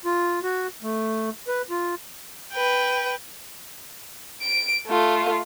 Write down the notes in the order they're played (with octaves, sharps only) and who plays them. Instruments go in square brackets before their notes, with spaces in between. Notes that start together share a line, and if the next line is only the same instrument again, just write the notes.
[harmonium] F4
F#4
A3
B4
F4
[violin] B4 G5
D7
A3 F4